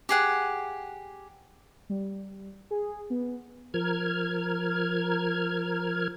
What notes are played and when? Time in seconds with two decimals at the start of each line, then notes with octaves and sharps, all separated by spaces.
0.09 G4 G#4 F#5
1.90 G3
2.71 G#4
3.10 B3
3.74 F3 A#4 F6 G#6